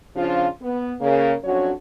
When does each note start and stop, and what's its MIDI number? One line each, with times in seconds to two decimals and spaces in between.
0.16 0.47 49
0.16 0.47 53
0.16 0.47 62
0.16 0.47 65
0.62 0.94 59
1.01 1.33 49
1.01 1.33 58
1.44 1.71 41
1.44 1.71 54
1.44 1.71 61
1.44 1.71 62
1.44 1.71 66
1.44 1.71 73